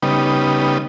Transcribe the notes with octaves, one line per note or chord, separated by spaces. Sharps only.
C#3 G3 B3 D#4